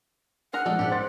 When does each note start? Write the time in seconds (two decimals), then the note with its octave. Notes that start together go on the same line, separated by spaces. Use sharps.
0.53 G#4 A#4 F#5 A#5
0.65 F3 G#3 D#4 A4 D5
0.79 G#2 G4 D5 E5
0.91 C5 C6 A6